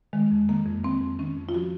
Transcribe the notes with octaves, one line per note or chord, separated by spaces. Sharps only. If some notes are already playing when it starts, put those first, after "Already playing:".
D#3 G#3
F2
D#3 A#3
F2
D#3 C4
F2
D#3 C#4
F2
F4
F3 F#4